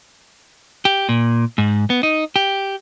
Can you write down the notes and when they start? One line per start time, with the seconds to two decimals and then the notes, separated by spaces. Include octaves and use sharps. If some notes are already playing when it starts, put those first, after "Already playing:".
0.85 G4
1.09 A#2
1.58 G#2
1.90 B3
2.03 D#4
2.36 G4